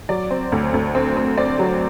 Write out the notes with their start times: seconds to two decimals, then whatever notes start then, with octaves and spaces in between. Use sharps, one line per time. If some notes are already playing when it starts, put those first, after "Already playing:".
0.09 F#3 D5
0.31 C4
0.52 D2
0.74 D2
0.95 C4
1.17 C4
1.37 C4 D5
1.59 F#3